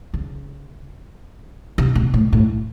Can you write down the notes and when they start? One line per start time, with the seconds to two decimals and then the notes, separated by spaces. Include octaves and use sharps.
0.14 C#3
1.78 C3
1.95 B2
2.14 A2
2.33 A2